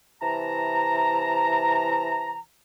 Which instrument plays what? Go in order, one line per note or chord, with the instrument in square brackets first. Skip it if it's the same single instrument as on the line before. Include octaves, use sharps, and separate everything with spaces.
[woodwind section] C3 E3 A5 A#5